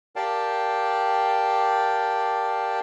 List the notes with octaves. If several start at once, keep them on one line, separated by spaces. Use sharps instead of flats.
G4 A#4 D5 F5 G5 A5